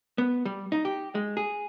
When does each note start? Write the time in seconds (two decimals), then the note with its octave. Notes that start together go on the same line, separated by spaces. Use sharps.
0.18 B3
0.45 G3
0.72 D#4
0.85 G4
1.15 G#3
1.37 G#4